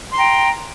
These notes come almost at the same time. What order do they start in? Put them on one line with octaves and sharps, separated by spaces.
C6 A#5 G5